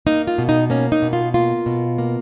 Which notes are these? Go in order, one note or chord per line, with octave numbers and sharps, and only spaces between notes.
A#3 D#4
F4
B2
D#4
A#3 C#4
D#4
B2
F4
A#3 F4
B2
A#3